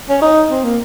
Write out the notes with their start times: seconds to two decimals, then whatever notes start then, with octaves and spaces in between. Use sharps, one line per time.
0.10 C#4
0.22 D#4
0.50 C4
0.64 A#3